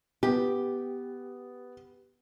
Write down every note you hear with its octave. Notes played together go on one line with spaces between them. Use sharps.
B3 G4